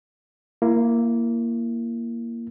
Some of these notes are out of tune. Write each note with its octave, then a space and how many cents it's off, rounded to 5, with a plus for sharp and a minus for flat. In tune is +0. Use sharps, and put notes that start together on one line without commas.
A#3 +0 E4 +30